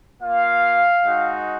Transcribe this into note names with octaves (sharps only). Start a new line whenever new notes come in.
A#3 F4 F5
G#3 D#4 F#4